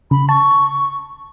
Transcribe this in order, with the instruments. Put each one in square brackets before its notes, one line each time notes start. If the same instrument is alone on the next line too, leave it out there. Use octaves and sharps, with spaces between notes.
[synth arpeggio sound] C#3 [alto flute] B5
[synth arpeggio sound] A5 [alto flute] C#6